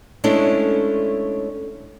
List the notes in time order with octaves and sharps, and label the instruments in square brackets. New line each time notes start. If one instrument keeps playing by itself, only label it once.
[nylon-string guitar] G#3 A3 C#4 D4 E4 A4